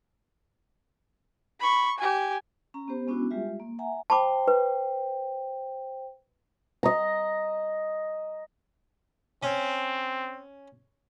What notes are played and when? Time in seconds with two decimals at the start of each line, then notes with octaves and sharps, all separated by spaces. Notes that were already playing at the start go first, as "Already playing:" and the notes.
1.60 B5 C#6
1.98 G4 G#5
2.74 C#4 A#5
2.88 B3 G4 C5
3.07 G#3 B3 C#4 D4 E4 F#4
3.31 G3 G#3 F4 G4 E5
3.60 A#3
3.79 E5 F#5 G#5 A#5
4.10 C5 G5 A5 B5 D6
4.48 B4
6.83 D#5 A#5
9.43 C4 C#4